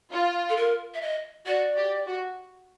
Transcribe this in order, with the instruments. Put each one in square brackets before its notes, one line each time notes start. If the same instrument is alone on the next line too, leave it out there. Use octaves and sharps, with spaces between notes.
[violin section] F4
[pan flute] A4
A#4
E5
D#5
[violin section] F#4 [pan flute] D5
[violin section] G4
F#4